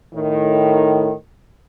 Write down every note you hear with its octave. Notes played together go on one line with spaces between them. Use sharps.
A2 D#3